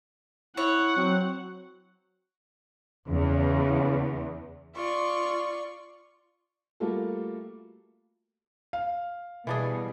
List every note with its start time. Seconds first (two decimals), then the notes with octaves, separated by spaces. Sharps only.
0.57 E4 C#5 F#5
0.97 F#3 C4
3.08 E2 C#3
4.76 F4 D5 C#6
6.80 G3 A3 A#3 F4 F#4 A4
8.73 F5
9.47 B2 E3 G3 D4 G#4